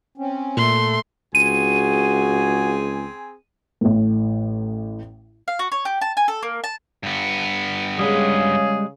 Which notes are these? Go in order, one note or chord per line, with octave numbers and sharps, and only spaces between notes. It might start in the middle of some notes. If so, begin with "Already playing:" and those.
C4 C#4
A#2 A3 A4 C6
C#2 C4 F#4 G#4 G#5 D#7
A1 A2
F5
F#4
C#5
G4
A5
G#5
A4
A#3
A5
G2 B3
C#3 G3 G#3 G#4